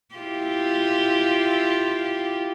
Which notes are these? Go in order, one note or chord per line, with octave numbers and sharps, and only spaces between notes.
E4 F4 G4